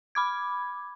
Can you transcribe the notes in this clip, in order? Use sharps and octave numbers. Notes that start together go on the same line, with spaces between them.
B5 D6 G#6